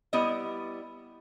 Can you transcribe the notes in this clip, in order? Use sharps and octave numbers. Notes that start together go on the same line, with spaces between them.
G3 B3 E4 D5 D#5